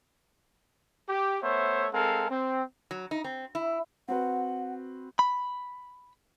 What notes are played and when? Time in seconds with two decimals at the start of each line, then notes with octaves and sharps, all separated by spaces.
1.09 G4
1.42 A3 B3 C5 C#5 E5
1.93 G#3 C4 A4 A#4 F5
2.30 C4
2.91 F#3
3.11 D#4
3.24 C4
3.55 E4
4.08 C4 F#4 B4 F#5
5.19 B5